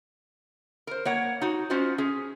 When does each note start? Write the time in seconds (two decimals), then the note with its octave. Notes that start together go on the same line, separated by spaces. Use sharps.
0.87 A#4 C5
1.05 A#3 C#5 F#5
1.41 D#4 F#4
1.70 C#4 F4 F#4 C5 D#5
1.98 C#4 G#4